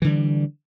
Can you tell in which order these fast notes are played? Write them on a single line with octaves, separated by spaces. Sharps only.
E3 D3 G3